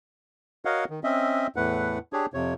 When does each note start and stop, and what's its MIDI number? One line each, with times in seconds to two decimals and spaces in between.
0.65 0.85 66
0.65 0.85 70
0.65 0.85 73
0.65 0.85 75
0.65 0.85 77
0.65 0.85 78
0.90 1.00 51
1.04 1.47 60
1.04 1.47 61
1.04 1.47 75
1.04 1.47 76
1.56 1.98 40
1.56 1.98 45
1.56 1.98 57
1.56 1.98 71
1.56 1.98 78
2.13 2.26 62
2.13 2.26 67
2.13 2.26 68
2.13 2.26 73
2.34 2.54 41
2.34 2.54 48
2.34 2.54 73